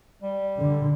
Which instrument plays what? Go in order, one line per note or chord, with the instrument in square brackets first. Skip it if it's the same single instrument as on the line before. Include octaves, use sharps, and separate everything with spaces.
[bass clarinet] G3
[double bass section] D3